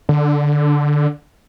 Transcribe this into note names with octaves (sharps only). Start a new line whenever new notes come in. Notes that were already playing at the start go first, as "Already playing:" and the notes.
D3